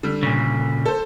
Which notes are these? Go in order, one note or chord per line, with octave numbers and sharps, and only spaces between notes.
D3 G3
A#2 C#3
A4 C5